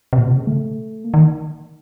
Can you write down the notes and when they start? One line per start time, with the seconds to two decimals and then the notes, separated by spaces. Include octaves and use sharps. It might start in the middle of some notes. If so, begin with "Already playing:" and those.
0.13 C3
0.18 A#2
0.27 C3
0.37 C#3
0.47 A3
1.04 A#3
1.14 D#3